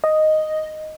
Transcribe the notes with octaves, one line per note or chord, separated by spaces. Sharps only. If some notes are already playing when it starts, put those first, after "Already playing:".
D#5